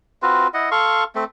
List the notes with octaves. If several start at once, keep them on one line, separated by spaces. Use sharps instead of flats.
C4 F4 F#4 B4
E4 D#5 F#5
A4 F5 C6 C#6
A3 C4